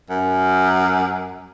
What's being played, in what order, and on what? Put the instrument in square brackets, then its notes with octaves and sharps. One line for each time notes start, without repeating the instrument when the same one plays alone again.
[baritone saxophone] F#2